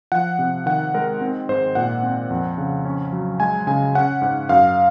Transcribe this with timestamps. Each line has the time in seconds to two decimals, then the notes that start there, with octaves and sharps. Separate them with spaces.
0.12 F3 F#5
0.39 C3
0.66 D#3 F#5
0.94 G#3 A#4
1.21 C4
1.49 G#2 C5
1.75 A#2 F#5
2.03 C4
2.30 F2
2.58 C#3
2.85 C#4
3.12 F#3
3.40 G#3 G#5
3.67 C#3 G#5
3.95 C#4 F#5
4.22 G#2
4.49 F#2 F5